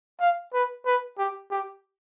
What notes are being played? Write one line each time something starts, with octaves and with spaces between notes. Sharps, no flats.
F5
B4
B4
G4
G4